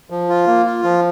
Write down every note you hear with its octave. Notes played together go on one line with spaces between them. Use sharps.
F3
F4
A#3
F4
F3